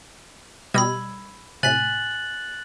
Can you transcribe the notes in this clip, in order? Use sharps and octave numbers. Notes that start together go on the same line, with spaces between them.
B2 G3 D#5 B5 E6 G#6
A2 C3 G#5 F#6 A6 B6 F#7